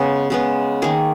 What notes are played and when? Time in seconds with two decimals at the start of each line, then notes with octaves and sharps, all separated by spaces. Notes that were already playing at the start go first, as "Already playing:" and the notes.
Already playing: C#3 G#3 B3 G#4
0.30 C#3 G#3 B3
0.82 D#3 A#3 G#4